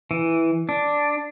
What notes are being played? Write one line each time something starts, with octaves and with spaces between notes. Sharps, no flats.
E3
D4